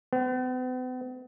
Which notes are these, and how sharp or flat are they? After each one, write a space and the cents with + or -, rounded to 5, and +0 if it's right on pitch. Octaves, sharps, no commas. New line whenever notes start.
B3 +45